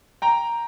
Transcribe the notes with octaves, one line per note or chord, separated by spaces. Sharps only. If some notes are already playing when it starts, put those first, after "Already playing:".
G5 A#5